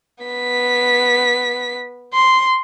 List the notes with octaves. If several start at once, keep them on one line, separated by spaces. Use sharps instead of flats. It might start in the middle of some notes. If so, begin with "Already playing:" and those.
B3 B6
C6